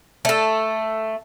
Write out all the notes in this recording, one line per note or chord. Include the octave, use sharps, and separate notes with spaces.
A3 A4